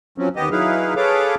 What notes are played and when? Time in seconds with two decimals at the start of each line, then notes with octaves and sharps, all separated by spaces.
0.18 F3 F#3 C4 C#4
0.36 D#2 B3 G4 D#5
0.51 F#3 D#4 E4 G#4 B4 F5
0.96 G#4 A4 B4 C#5 F5 D6